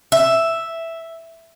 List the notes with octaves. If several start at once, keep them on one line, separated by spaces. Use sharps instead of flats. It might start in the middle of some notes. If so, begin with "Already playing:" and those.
E5